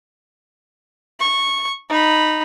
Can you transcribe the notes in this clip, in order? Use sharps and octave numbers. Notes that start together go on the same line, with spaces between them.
C#6
D#4 B5